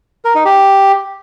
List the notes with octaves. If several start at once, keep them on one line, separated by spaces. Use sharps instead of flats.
A#4
D#4
G4